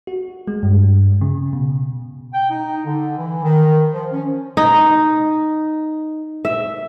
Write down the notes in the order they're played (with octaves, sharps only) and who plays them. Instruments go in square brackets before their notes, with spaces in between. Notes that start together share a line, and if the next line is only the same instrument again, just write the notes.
[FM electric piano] F#4
G#3
G2
C#3
B2
[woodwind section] G5
D#4
D3
E3
D#3
F3
C#4
[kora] D#4
E5